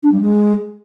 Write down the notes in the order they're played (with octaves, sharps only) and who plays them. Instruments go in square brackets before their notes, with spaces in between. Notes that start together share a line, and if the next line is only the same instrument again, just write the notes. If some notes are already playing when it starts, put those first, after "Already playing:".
[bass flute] D4
G3
G#3